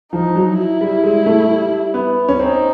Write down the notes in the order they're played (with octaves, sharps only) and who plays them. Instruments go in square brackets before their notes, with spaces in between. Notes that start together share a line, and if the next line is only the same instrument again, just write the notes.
[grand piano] F3 [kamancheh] D#4
[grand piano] F#3
[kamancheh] E4
[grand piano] G3
G#3
A3
G3
B3
C#4
[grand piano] C4 [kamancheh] D#4